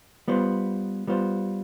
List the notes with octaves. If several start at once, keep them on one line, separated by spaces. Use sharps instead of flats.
G3 B3 F4 C5
G3 B3 F4 C5